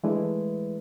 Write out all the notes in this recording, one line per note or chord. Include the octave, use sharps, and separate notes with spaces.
E3 G#3 A3 D4 E4 B4